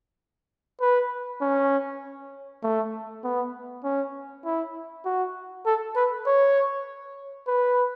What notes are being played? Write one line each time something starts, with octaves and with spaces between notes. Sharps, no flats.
B4
C#4
A3
B3
C#4
E4
F#4
A4
B4
C#5
B4